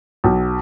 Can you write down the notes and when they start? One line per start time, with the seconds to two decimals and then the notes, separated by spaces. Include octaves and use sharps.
0.24 B1